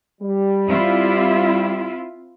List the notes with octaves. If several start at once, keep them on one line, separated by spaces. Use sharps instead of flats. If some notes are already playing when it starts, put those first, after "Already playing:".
G3
C4 E4 F4